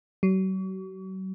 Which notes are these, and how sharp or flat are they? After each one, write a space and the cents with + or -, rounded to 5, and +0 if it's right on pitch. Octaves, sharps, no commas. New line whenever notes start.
F#3 +40